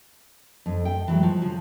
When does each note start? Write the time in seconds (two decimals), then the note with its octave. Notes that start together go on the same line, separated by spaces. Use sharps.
0.66 F2
0.85 G5
1.08 E3 F#3 G#3
1.23 F3
1.41 C#3 F3